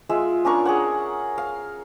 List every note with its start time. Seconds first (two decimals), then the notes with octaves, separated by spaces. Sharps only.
0.09 G#3 F4 E5
0.45 C#4 D4 A#4 C#6
0.65 G#4 C#5 F#5
1.38 F5